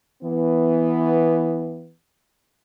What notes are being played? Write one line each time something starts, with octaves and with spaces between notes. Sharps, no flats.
E3 B3